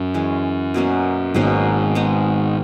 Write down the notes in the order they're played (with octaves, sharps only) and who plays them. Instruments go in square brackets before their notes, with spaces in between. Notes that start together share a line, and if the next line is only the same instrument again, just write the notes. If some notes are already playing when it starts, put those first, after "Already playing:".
Already playing: [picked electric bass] F#2
[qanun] E3 G#3 C#4
B2 F#3 A#3 C#4
[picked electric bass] G#1 G#2 [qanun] B2 F#3 A#3 C#4
[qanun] G#3 B3 D#4